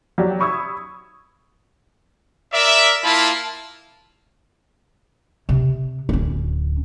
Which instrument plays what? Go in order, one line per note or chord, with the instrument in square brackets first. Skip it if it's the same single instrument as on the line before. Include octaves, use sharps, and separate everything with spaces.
[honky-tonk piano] F#3 G4 D5
B5 C#6 D#6 E6 G#6
[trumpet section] A#4 D5 E5
A#3 E4 F4 A5 B5
[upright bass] C3
D1 C#4